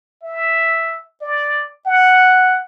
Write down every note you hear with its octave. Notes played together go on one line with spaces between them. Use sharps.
E5
D5
F#5